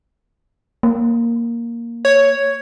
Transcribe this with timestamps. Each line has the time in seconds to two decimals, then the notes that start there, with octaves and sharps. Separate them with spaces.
0.83 A#3
2.05 C#5